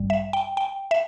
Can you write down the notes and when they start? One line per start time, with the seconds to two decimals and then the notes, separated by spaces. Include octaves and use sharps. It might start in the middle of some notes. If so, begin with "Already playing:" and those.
Already playing: A1 G2 G3
0.10 E5
0.33 G5
0.57 G5
0.91 E5